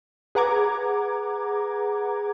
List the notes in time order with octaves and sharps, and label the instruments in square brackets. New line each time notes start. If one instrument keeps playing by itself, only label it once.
[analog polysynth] G#4 B4 F#5 A#5 D6 G#6